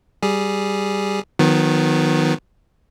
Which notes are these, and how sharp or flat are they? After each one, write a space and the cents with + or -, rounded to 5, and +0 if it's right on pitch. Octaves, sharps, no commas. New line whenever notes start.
G3 -5 G#4 +0
D#3 +0 F#3 -40 B3 +0